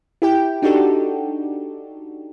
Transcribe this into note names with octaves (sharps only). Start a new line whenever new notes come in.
E4 G4 G5
D4 D#4 F#4 G4 A4